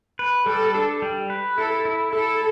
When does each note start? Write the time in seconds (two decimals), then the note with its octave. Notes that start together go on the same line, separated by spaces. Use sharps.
0.19 B4
0.46 G3 A4
0.74 D4
1.02 G3
1.30 B4
1.58 E4 A4
1.85 E4
2.13 E4 A4